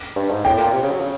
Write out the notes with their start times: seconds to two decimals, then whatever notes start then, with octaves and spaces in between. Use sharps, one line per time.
0.16 G2
0.31 G#2
0.45 A2 G5
0.58 A#2
0.72 C3
0.82 C#3
0.91 F#3
1.01 C#3